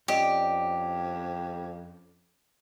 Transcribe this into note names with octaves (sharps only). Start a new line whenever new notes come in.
F2 C#4 G4 D5 D#5